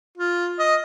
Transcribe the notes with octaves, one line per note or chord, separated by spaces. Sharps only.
F4
D#5